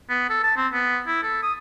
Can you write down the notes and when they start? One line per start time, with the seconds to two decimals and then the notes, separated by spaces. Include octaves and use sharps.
0.10 B3
0.30 A4
0.43 A5
0.57 C4
0.73 B3
1.07 E4
1.23 A4
1.43 D#6